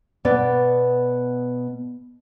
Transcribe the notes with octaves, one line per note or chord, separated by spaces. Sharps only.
B2 B3 B4 D5